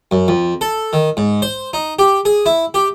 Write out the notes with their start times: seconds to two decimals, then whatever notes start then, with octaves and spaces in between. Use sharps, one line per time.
0.11 F#2
0.28 F2
0.61 A4
0.93 D#3
1.17 G#2
1.42 C5
1.73 D#4
1.99 G4
2.25 G#4
2.46 E4
2.74 G4